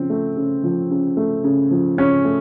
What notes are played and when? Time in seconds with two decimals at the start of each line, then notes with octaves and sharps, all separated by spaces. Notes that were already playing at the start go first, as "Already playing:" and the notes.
Already playing: C#3 F3 C4
0.10 A3
0.37 C#3
0.64 F3
0.91 C#3
1.17 A3
1.44 C#3
1.71 F3
1.98 C#3 C#4
2.25 A3